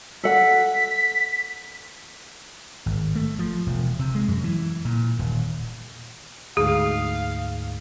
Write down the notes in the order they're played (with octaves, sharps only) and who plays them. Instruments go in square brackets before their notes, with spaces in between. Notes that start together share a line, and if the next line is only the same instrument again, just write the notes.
[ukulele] A4 F#5 [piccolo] B6
[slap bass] G#1
A3
F3
E1
C3
G#3
F#2
E3
A#2
D#1
[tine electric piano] D2 G#2 [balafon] G#4 [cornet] F5